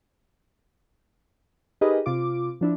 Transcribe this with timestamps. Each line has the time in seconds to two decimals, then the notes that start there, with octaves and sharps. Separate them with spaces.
1.81 D#4 G4 G#4 A#4 B4 D#5
2.06 C3 F4 D6
2.61 F3 D4 E4